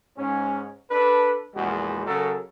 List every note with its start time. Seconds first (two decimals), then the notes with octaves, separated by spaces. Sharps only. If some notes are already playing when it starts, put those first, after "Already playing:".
0.17 G#2 C#4
0.90 D4 A4 B4
1.55 A#1 E2 G#3 F#4
2.06 C#3 F#3 A4 A#4